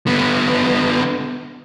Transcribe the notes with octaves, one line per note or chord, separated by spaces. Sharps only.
D3 B3